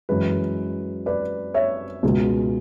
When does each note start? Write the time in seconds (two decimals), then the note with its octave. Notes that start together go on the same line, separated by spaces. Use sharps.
0.09 F#2 E3 G#3 B4
1.06 B4 D5
1.54 C#5 E5
2.03 C#2 B2 G#3